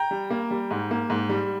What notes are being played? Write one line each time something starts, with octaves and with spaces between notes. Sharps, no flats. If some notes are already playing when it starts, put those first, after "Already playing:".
Already playing: G5 A#5
G3
A#3
G3
G#2
A#3
G#2
G3